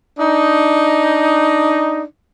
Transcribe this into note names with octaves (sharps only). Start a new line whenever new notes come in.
D4 D#4